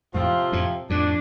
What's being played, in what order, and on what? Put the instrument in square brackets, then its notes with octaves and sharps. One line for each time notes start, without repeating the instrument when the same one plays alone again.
[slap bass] F2 A2 [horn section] C3 F3 C4 F4
[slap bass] F2 A2
[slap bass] F2 A2 [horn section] D4